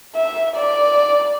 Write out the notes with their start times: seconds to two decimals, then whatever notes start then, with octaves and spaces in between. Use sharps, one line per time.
0.15 E5
0.56 D5